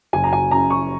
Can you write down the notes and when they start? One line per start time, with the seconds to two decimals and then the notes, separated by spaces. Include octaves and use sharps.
0.13 F#1 G#5
0.24 A#5
0.33 G#5
0.51 F#2 A#5
0.70 C#6